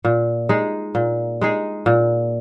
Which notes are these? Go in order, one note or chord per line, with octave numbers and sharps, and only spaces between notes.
A#2
G#3 D#4 G#4
A#2
G#3 D#4 G#4
A#2